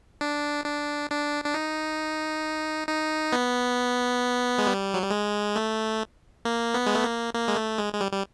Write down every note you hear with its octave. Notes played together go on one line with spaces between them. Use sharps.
D4
D4
D4
D4
D#4
D#4
B3
G#3
G3
F#3
G3
G#3
A3
A#3
B3
G#3
A3
A#3
A#3
G#3
A3
G#3
G#3
G3
G3